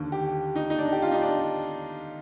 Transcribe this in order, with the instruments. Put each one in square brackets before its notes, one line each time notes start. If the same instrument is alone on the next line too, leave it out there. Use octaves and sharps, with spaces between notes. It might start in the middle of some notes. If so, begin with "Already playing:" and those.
Already playing: [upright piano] D#2 D3
G4
D#4
D#4
D4
G4
F4
D#4
D4